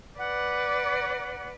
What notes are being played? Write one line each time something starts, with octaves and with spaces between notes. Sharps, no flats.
B4 D5 F#5